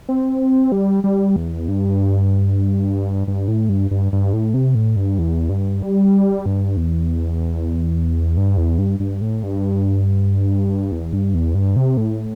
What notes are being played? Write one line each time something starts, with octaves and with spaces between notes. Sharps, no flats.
C4
G3
G3
E2
G2
G2
A2
G2
G2
G2
A2
C3
A2
G2
E2
G2
G3
G2
E2
G2
E2
G2
G2
A2
G2
E2
G2
E2
G2
C3
A2